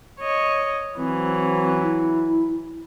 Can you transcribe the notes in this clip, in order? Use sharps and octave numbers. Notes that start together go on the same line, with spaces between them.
C#5 D#5
E3 F#3 C4
E4